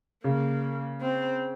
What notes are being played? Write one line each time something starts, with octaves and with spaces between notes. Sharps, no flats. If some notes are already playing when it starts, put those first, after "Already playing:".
C#3 A#3
C4